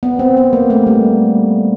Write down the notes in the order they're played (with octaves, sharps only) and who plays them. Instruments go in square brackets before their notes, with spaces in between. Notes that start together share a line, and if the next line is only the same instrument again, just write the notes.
[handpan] B3
C4
B3
A#3
A3
G3